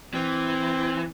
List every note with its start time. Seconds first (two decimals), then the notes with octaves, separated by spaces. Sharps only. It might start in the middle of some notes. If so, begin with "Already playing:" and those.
0.14 E3 C4